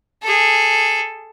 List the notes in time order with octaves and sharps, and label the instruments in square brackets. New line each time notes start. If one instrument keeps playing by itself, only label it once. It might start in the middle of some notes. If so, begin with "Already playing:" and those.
[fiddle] G#4 A4